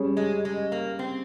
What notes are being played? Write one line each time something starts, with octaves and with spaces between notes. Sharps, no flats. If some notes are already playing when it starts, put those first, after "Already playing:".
Already playing: G3 C#4 G#4 C#5
G#3
G#3
A#3
C4